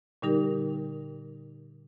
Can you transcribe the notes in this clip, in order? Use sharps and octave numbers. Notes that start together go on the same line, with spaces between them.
A#2 D3 G3 D#4 G4 A#4